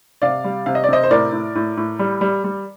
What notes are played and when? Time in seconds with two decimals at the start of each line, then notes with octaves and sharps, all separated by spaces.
0.22 C3 D5 F5
0.44 G3
0.66 C3 F5
0.75 D#5
0.84 D5
0.89 C3 C5 D#5
1.03 C5
1.11 A2 A#4 D5
1.32 A2
1.55 A2
1.77 A2
1.99 G3
2.21 G3
2.44 G3